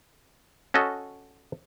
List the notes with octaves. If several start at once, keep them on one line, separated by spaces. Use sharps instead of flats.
C#4 F#4 A4 D#5